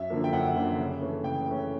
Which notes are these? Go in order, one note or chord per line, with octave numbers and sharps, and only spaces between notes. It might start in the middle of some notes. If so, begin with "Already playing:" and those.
Already playing: F#2 E5
D3 F3 A#3
G5
F#2 F#5
D3 F3 A#3
C#3
E3 A3 C#4
C#3 G5
E3 A3 C#4